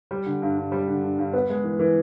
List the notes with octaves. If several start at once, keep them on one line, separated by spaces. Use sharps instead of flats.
G3
D3
G2
G2
G3
D3
G2
G2
B3
G#3
E3
E3